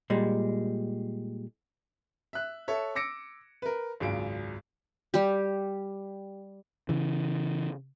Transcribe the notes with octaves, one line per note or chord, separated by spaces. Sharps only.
A#2 G3 G#3
E5 F#6
A4 C#5 E5
D6 E6 A#6 C#7 D7
A#4 B4
G#1 C#2 F#2 D7
G3 G4
C#3 E3